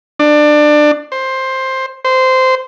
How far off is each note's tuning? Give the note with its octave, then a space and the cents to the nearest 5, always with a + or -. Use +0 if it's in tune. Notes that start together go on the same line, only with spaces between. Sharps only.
D4 +20
C5 +10
C5 -15